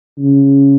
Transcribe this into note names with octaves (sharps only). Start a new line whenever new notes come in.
C#3